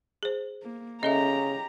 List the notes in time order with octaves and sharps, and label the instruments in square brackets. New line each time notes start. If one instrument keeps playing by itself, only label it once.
[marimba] G#4 C5
[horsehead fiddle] A#3
[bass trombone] C#3 [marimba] C#4 A4 E5 [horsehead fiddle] G4 A#5 [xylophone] D#5